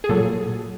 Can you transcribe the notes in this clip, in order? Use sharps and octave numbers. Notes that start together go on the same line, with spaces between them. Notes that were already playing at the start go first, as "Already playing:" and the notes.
G#4
A#2 F#3 A4